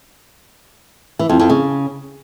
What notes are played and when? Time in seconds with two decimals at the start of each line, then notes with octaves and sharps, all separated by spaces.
1.19 E3
1.29 F2
1.40 F2
1.50 C#3